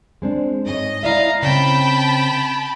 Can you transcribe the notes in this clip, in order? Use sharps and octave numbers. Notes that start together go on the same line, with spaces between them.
G#3 C4 D4
G#2 C#5 D#5
E4 D5 E5 F5 A#5
C#3 C4 G5 A5 B5